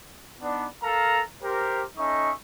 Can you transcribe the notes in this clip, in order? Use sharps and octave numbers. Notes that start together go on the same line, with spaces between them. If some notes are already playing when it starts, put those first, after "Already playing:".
B3 D4 D#4 D5
A4 A#4 F5 A#5
G4 A#4 C5
C#4 D#4 A4 D#5 E5 C#6